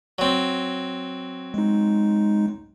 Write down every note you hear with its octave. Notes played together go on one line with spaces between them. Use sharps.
F#3 C4
G#3 D#4